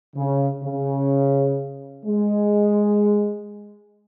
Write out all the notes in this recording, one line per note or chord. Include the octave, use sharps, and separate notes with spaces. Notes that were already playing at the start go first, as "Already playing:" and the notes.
C#3
C#3
G#3